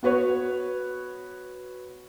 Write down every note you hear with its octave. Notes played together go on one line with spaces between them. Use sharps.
B3 F#4 B4 C#5